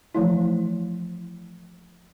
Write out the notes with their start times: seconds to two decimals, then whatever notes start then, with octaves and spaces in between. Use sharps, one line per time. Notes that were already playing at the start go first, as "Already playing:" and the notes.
0.15 E3 F3 A3 E4